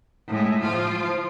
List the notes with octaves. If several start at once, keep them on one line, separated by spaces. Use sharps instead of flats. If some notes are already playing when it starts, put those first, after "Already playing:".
A2 G#3
F3 F4